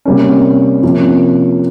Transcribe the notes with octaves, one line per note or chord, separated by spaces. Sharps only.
C3 G3 A#3 C#4
C3 F3 A#3 C#4